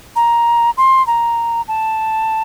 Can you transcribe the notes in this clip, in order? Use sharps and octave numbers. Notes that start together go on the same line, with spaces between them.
A#5
C6
A#5
A5